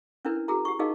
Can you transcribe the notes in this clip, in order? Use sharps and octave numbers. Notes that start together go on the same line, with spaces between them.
C#4 D4 E4 A#4 B4
F#4 G#4 A#4 A#5
G4 C#6
D#4 G#4 A#4 D#5 F5